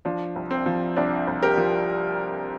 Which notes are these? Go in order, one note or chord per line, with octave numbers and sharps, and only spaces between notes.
F3 D4
C2
C4
F3
C2 D4
C2
G4 A#4
F3